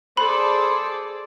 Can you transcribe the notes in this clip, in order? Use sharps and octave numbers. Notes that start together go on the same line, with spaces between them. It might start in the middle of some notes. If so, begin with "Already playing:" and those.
G#4 A4 C5 D5 B5